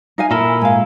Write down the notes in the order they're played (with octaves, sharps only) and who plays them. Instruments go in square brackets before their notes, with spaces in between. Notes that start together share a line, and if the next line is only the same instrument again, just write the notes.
[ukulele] D#4 F5 G#5
[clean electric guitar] A#2 A4 [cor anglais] E4 [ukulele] A#4
[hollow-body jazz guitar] G#2 F5 [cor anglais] G#5